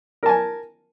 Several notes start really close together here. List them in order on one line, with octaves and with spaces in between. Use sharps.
A#4 A5 G#5